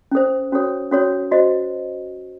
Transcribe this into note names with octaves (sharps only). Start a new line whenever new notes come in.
C#4 A4 C5
C#4 F#4 A4 C#5
C#4 F#4 A4 C#5
F#4 C5 D#5